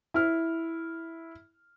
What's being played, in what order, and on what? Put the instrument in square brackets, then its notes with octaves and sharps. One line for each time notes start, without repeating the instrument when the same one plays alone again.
[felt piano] E4 F6